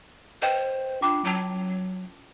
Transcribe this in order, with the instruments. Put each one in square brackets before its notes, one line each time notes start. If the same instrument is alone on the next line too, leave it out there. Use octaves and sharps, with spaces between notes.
[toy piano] B4 D#5 G5 [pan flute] C5
[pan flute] D4 [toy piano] F4 G5 D6
[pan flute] F#3 [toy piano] C#4 E4 A5